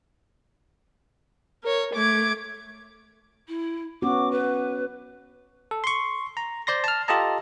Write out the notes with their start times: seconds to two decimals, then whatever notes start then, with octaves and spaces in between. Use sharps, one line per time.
1.62 A#4 C#5
1.92 A3 D6 G#6
3.48 E4
4.02 B3 C#4 F#4 D6
4.32 B4
5.71 A4
5.84 C6 C#6
6.37 A#5
6.67 C5 D5 C6 A#6
6.84 A5 F6
7.08 F4 G4 A4 D#5 A5 A#5